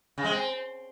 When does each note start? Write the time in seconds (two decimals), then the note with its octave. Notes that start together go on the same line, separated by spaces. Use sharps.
0.18 C#3
0.24 G#3
0.31 C4